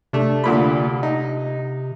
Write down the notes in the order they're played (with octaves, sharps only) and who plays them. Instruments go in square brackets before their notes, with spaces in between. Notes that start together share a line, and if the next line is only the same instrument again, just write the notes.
[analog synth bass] C3 [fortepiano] A3 D4
[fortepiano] D2 A#2 B5
D#4